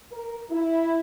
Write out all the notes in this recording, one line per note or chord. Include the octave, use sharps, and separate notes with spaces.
A#4
E4